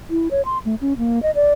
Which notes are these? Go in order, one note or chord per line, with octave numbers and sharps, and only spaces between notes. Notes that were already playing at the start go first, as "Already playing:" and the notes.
E4
C#5
C6
A3
C#4
A#3
D#5
D5